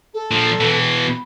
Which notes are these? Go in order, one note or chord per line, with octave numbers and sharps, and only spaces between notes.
A4
A#2 F3
B2 E3
B5